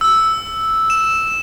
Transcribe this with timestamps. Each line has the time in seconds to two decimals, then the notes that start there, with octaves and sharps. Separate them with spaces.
0.01 E6
0.90 E7